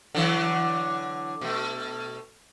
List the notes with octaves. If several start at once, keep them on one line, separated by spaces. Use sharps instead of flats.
D3 E3 F#3
B2 A3